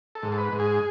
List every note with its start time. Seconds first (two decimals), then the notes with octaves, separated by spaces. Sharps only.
0.15 A4
0.23 G#2
0.32 A4
0.38 B4
0.52 G#2
0.60 G#4